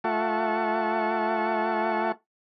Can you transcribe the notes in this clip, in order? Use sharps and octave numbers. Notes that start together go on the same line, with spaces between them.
A3 F4 E5 F#5 A5 C#6